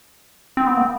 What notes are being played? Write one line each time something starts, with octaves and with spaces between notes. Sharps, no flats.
C4
B3
A#3